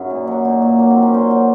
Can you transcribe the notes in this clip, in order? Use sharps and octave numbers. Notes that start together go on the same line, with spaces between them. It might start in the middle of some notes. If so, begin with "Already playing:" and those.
Already playing: F#2 C#3 F#3 C#4 D#4
A#2
F#3
A#2 D#4
A#2
F#3 A#3
C4
F#3
C#4
A#2 C5
F#3